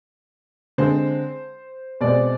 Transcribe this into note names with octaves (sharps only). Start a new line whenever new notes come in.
D3 G#3 C4 C5
B2 G#3 C4 D5